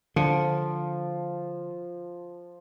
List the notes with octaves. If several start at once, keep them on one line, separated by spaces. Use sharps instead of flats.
D3 F3